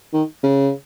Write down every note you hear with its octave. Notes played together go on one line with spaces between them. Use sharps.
D#3
C#3